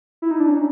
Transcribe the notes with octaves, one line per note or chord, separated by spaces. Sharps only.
E4
D#4
D4
C#4